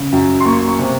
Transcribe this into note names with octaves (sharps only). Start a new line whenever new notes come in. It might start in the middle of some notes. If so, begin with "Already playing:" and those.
Already playing: C#3
F#2
C6
A#3 C#6
C#6
C3